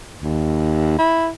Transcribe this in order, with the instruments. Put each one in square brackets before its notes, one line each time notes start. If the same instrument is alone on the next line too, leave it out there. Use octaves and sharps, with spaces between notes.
[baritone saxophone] D#2
E4